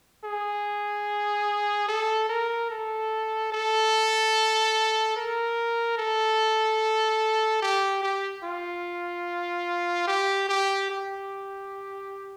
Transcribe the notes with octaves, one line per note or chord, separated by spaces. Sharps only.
G#4
A4
A#4
A4
A4
A#4
A4
G4
G4
F4
G4
G4
G4